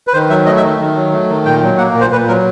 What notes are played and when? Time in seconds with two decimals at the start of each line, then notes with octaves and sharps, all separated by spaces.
0.07 B4
0.13 D#3 C5
0.30 F#3 E5
0.46 A3 D#5
0.57 E5
0.63 D#3
0.80 D#3
0.96 F#3
1.12 A3
1.29 D#3
1.45 A#2 G5
1.62 F#3
1.78 A#3 F#5
1.94 A#2
2.01 C5
2.12 A#2 B4
2.28 F#3 A#4